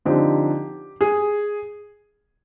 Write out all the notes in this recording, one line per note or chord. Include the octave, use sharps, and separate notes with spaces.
D3 F3 C4 D#4 G4
G#4